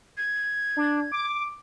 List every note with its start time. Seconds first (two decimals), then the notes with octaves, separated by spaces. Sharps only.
0.17 G#6
0.77 D4
1.12 D6